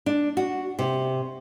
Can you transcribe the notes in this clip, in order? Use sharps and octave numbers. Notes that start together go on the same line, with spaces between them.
D4
F#4
C3